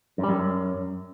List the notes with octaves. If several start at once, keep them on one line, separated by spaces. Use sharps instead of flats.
F#2
G3
F#2